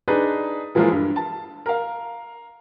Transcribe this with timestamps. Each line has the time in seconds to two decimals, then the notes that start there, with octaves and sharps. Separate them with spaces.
0.08 D4 D#4 G#4 B4
0.75 E3 F3 G#3 A#3 E4 F4
0.92 G2
1.16 A5
1.66 A#4 F5